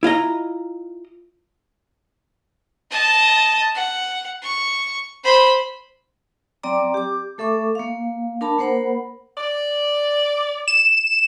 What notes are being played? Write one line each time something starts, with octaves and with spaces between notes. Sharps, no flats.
E4 F4 D#5 A#5
D#5 A5
F#5
C#6
C5 B5
F#3 C4 D5 G5 A#5 D6
G4 D6
A3 A4 E5 C#6 D6
A#3 F5
D4 A#4 A5 B5
A#3 A#4 C5 F#5 B5
D5
E7